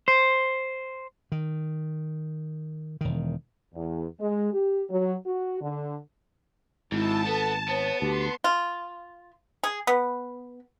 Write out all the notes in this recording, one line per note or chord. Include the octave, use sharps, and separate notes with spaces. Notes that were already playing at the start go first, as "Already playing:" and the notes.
C5
D#3
E1 D#3
E2
G#3
G4
F#3
F#4
D3
G#1 G#2 E4 A5
B3 A4
B3 C#5
D2 G4 C6
F4
G#4
B3